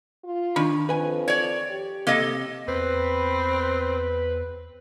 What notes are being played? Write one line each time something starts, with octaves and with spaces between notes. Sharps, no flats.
F4
D#3 D4 B5
F2 B4 G#5
C#5 D5
G4
C3 A#3 A4 D#5
E2 C4 B4